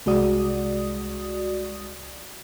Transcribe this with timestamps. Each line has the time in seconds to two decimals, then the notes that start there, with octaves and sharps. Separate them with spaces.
0.06 C2 G#3 F#4 D5 D#6